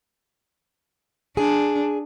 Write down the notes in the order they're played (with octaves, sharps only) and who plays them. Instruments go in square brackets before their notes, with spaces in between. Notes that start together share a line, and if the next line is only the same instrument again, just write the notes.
[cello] D4 [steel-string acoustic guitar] G#4